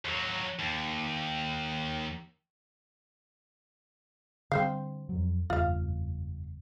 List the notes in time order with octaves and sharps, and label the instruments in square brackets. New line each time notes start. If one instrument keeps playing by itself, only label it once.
[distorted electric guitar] D#2 F#3
D#2
[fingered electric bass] D3 G3 [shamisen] C4 C5 F5
[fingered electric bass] F2 F#3
[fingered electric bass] F#1 E2 G2 [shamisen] F4 F5